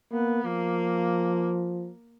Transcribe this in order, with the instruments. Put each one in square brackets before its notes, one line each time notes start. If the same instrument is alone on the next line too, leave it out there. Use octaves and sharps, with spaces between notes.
[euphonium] A#3 [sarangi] B3
[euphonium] F3 [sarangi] A#3